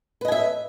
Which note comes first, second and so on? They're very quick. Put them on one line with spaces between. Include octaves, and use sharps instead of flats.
B4 D#5 G#5 E5